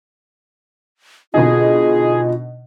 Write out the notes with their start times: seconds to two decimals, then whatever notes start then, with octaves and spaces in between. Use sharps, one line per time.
1.34 B2 D3 D#4 F4 G#4